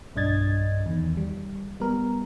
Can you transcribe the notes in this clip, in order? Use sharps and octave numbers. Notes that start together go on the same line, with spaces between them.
B1 G2 D4 D#5 G#6 A6
E2 D#3
G3
G3 B3 A#4